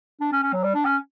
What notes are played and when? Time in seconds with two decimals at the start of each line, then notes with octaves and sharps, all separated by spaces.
0.21 D4
0.32 C#4
0.43 C#4
0.53 F#3
0.64 G3
0.75 D4
0.85 C#4